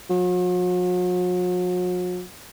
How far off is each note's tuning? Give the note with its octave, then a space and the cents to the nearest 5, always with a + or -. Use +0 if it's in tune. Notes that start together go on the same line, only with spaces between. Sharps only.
F#3 -45